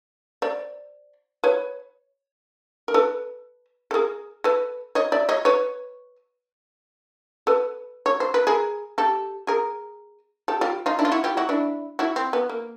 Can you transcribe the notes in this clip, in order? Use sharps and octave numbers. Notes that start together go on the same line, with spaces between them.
C5 D5
B4 C#5
A#4
A4 B4
A4
G#4 A#4
A4 B4
C#5 D#5
D5 E5
C#5 D#5
B4 C#5
A4 B4
C#5
C5
B4
G#4 A#4
G4 A4
G#4 A#4
G4 A4
F4 G4
D#4 F4
D4 E4
F4
E4 F#4
F4 G4
E4 F#4
D4 E4
E4 F#4
C4
B3
A#3